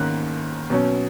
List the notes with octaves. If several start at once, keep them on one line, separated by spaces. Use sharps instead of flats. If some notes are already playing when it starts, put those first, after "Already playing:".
Already playing: G#2 D#3 A#3 C#4 F#6
B2 F#3 C#4